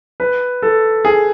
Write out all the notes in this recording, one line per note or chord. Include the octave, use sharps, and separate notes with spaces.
B4
A4
G#4